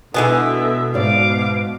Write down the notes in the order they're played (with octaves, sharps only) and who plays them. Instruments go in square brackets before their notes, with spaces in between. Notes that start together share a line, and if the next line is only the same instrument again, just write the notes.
[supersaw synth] B2 [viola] D3 E5 [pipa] E3 G#3 B3
[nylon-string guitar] G#2 D5 [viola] F5 D6